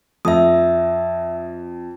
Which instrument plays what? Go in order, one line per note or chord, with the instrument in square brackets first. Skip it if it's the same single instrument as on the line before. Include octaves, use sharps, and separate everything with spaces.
[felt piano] F2 [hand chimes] E5 D#6